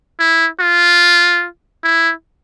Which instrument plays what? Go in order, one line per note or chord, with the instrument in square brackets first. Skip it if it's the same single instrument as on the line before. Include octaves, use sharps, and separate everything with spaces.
[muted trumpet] E4
F4
E4